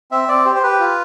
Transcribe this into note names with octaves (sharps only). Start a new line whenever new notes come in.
C4 E5
C4 D5
G4 C5
C5
G4 B4
F4